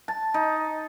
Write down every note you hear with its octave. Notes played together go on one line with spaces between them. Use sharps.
A5
D#4